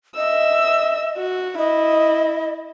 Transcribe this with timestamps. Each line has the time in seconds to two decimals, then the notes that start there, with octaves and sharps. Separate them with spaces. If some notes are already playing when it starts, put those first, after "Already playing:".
0.16 D#5 E5 E6
1.17 F#4
1.58 E4 D#5